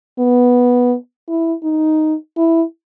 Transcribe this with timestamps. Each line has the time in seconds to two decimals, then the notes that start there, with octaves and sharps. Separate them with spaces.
0.19 B3
1.28 E4
1.64 D#4
2.37 E4